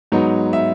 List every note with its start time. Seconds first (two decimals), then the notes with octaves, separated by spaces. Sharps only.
0.12 G#2 F#3 B3 D#4
0.53 E5